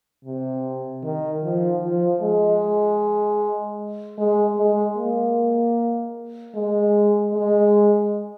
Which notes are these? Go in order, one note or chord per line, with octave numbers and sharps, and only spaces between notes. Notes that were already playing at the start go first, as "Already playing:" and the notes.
C3
D#3
F3
F3
G#3
G#3
G#3
A#3
G#3
G#3